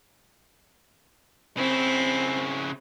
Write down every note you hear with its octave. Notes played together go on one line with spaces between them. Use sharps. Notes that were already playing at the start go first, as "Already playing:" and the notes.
C#3 C4 E4